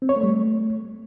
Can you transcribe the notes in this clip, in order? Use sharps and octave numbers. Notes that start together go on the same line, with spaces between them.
C4
C#5
A3
G3
A3